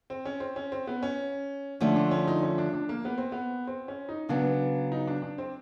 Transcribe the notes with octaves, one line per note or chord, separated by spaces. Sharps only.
C4
C#4
C4
C#4
C4
B3
C#4
D3 F3 A3 C#4
D4
C#4
D#4
C#4
D4
D4
A#3
B3
C4
B3
C4
C#4
D#4
C#3 F#3 B3 D4
D#4
D4
D4
C4